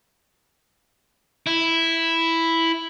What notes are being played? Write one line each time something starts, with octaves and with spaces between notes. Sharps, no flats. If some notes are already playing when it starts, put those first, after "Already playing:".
E4